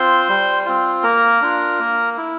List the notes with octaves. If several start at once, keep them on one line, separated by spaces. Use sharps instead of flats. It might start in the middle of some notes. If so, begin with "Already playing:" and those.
Already playing: C4 F4 C5 C6
G3
C4 F4
A#3 A#4 A#5
D4 F4
A#3
E4